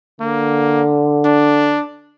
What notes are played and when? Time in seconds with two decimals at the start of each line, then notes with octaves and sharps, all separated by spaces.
0.21 D3 A#3
1.25 D4